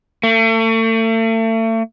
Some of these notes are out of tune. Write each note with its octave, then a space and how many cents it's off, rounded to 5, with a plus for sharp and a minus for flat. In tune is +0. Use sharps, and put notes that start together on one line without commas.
A3 +40